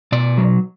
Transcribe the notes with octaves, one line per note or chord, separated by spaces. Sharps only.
B2 D5
F#3